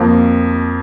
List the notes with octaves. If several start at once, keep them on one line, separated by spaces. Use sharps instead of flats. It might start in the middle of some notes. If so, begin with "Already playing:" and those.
Already playing: F2 F3 A#3